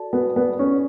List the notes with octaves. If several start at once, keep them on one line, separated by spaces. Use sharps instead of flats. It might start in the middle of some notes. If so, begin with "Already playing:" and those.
Already playing: F#4 A4 D5 A5
B3 F#4
B3 D5
C#4 A4